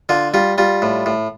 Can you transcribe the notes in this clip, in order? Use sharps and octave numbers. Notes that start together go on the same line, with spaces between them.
D3 F4
G3 F4
G3 F4
A2
A2